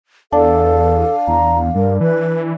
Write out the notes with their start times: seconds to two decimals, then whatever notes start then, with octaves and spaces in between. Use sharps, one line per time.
0.32 E2 D4 A4 F5
1.28 E2 A#5
1.75 G2 A#4
2.01 E3 B4